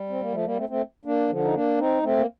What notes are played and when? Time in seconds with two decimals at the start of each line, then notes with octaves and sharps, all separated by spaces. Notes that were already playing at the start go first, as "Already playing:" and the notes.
Already playing: G3
0.09 C4
0.21 A#3
0.32 F3 A3
0.45 G3 A#3
0.56 A3 C4
0.69 A3 C4
1.05 A#3 D4
1.29 D3 F3
1.44 D#4
1.54 A#3 D4
1.78 C4 D#4
2.03 A3 C4
2.17 A#3